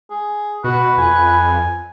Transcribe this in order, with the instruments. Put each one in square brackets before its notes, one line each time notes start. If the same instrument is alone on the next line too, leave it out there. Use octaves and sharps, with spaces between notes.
[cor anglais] G#4
[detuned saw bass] B2 [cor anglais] F#4 [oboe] B4
[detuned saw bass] F2 [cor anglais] G#5